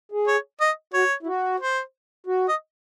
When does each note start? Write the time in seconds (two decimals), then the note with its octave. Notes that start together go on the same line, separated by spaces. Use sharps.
0.12 G#4
0.27 C#5
0.61 D#5
0.94 F#4 C#5
1.23 E4
1.27 F#4
1.60 C5
2.26 F#4
2.48 D#5